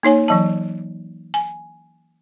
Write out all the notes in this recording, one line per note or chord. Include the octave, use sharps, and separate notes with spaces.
A#3 D#4 C#5 G#5
E3 F#3 A5
G#5